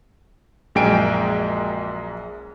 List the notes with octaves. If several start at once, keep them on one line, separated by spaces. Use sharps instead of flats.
A#1 F#2 G#3 G5 G#5 D7